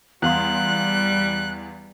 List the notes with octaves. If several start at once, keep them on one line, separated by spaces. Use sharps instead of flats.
E2 G3 F5 C6 F#6